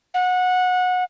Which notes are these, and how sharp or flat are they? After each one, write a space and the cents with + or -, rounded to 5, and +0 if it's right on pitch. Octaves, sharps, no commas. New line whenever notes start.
F#5 -20